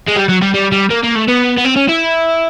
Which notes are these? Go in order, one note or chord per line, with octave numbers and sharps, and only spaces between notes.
G#3
G3
F#3
G3
G3
G3
A#3
A#3
A3
B3
B3
C4
C#4
E4